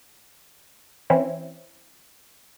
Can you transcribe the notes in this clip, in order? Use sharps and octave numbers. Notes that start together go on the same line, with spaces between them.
E3 C4 C#4 E4